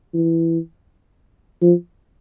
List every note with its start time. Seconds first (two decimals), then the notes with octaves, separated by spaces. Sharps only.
0.14 E3
1.62 F3